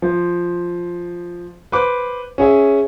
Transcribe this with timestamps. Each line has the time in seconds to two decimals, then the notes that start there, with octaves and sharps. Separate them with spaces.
0.02 F3
1.72 B4 C5 D6
2.38 C#4 G#4 E5